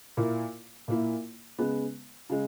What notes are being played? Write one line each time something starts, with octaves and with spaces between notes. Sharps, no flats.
A#2 A#3 E4
A#2 A#3 E4
C#3 G#3 B3
C#3 G#3